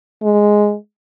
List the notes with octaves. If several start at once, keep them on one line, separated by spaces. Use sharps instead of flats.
G#3